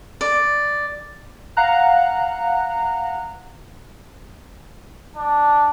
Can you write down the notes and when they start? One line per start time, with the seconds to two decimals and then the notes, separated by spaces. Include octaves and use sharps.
0.21 D5
1.57 F5 F#5 A#5 F#6
5.16 D4